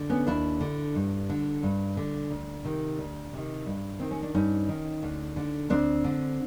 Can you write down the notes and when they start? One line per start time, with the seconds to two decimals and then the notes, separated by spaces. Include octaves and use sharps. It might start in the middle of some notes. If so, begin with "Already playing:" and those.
Already playing: D3
0.10 B3 C#4
0.27 D#2 D4 E4
0.60 D3
0.95 G2
1.30 D3
1.63 G2
1.97 D3
2.31 D2
2.64 C3 D#3
2.98 D2
3.33 C3 D#3
3.66 G2
4.00 D#3 C4
4.11 C#4
4.22 D4
4.35 G2 C#4 D#4
4.69 D#3
5.03 D2
5.36 D3
5.70 D2 C4 D4
6.04 D3